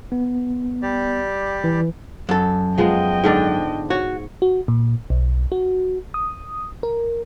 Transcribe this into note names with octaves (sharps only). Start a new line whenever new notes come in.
B3
G3 G4 D5
E3
F#2 A4
F3 G#3 B3 D#5 G5
G#2 D3 D4
F#4 C#5
F#4
A#2
B1
F#4
D#6
A#4